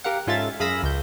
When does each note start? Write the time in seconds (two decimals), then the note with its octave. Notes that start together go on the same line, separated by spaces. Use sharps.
0.04 G4 A#4 F5 F#5
0.27 G#2 C#4 F4 A4 E5 A6
0.60 F#2 G#4 F5 B5 E6 A#6
0.82 C#2 G6